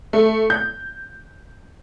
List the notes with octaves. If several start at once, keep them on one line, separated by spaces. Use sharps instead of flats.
A3
G6